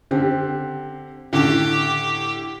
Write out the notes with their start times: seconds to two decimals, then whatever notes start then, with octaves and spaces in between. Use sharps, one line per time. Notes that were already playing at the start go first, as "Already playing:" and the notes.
0.11 D3 C4 G4
1.33 A2 D3 G4